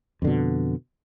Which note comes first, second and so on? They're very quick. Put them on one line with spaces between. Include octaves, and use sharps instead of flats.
F2 D3 B2